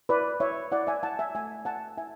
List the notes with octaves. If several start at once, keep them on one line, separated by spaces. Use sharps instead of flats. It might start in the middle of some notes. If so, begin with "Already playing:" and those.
E4 B4 D5
E4 C#5 E5
E4 D5 F#5
E5 G#5
E4 F#5 A5
E5 G#5
A3 E5 G#5
E4 F#5 A5
E4 E5 G#5